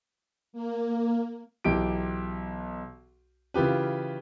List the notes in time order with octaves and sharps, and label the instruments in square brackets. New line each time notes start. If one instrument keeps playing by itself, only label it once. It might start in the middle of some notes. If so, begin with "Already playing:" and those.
[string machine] A#3
[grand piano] B1 E3 G4 D7
C#3 E3 F4 G4 B4